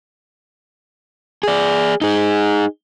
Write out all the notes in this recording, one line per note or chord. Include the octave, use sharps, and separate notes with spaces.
G#4 D5
D#4 G#4